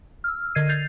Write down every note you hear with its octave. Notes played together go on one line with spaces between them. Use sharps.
E6 F6
D3 A#4 D#5 G#6 C7 D#7
G6 A6 C7 F7